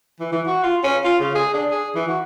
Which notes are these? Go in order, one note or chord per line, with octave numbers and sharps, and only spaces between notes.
E3
E3
F#4
F4
C#4
F4
C#3
G#4
D4
G#4
E3
F#4